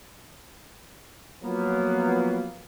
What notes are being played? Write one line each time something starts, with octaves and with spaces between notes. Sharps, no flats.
F3 F#3 A#3 B3